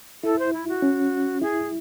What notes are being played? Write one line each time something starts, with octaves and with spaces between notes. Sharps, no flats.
E4 A4
C5
E4
F#4
C#4
E4 G#4